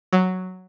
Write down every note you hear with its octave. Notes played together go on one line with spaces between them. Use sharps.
F#3